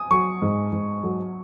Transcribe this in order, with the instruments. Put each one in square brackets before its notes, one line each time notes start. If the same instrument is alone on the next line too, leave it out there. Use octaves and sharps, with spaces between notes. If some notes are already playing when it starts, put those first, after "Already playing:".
Already playing: [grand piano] G#5 D#6
[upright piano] F#3 [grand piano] C#6
[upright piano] G#2
G#2
F#3